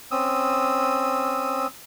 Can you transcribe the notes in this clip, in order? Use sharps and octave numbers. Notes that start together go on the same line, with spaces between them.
C4 C#4 D#6 E6